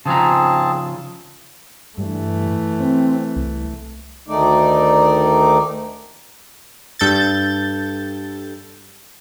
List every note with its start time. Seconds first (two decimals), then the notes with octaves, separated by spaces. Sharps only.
0.06 C#3 F3 C4 G#4 A5 A#5
1.98 G2 E3 A3
2.80 C4
3.36 C2
4.28 D2 D#3 A3 D#4 D5
6.99 G2 A4 G6 A6